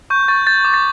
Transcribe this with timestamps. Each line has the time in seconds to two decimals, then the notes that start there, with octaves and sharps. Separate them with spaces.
0.10 C#6 G6
0.28 C#6 A6
0.47 G6 A6
0.65 D6
0.74 A6